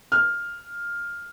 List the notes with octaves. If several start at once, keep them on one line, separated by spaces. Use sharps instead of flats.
F6